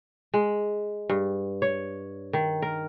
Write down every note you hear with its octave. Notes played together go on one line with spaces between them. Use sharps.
G#3
G2
C#5
D#3
A#4